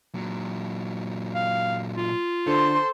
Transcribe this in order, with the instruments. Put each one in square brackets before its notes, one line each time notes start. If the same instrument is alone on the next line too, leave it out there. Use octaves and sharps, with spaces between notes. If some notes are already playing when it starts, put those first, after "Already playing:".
[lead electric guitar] A#2 F#3
[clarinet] F5
F4
[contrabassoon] D3 [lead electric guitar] A4 [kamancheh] C5 C6